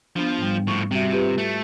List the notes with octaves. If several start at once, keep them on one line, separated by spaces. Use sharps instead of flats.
F3 B3 D4 F4
G#2 G3
A2 F3 C#6
C3 G3 F#4 E5
F4 G4 B4
A3